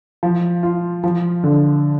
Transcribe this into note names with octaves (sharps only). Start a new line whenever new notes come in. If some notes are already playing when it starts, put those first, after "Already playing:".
F3
F4
F3
D3